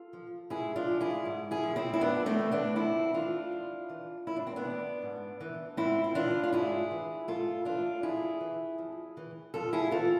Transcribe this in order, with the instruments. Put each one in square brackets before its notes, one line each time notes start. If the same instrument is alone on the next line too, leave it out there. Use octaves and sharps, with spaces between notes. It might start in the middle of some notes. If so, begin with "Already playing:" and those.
Already playing: [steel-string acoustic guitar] F4 A4
F3
G#2 E4 G#4
D4 F4
F3
E4 G#4
G#2
E4 G#4
F3
C4 E4
E4
F2 B3 D4
A3 C4
E3
B3 D4
F2 C4 E4
E3 D4 F4
F2
E3
F2 E4
D4
C4
B3 D4
E3
G#2
E3
G#2 C4 E4
E4
E3 D4 F4
F4
G#2 E4 G#4
E3
G#2 F4 A4
E3 D4 F4
F2 E4 G#4
E3
F2
E3
F2 F4 A4
E4 G#4
E3 F4 A4